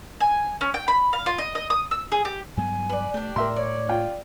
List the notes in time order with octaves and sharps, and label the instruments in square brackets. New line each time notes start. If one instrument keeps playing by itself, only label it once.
[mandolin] G#5
C#4
G5
B5
F5
F4
D#5
D#5
D#6
E6
G#4
G4
[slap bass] G2 F#3 B3 [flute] G#5
[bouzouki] B4 D5
[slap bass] A3 [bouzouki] D4 G4
[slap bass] A2 [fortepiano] A#4 E5 C6
[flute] C#5 [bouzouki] D5
[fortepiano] F4 G5